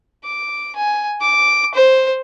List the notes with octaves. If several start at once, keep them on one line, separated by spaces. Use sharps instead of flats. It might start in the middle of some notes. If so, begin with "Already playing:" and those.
D6
G#5
D6
C5